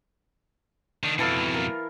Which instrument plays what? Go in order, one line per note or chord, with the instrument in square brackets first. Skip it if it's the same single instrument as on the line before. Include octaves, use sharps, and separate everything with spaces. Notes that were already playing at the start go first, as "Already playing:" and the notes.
[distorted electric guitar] D#3 D4
[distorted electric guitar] F2 B2 [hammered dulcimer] E3 A4 F5
[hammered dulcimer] A#4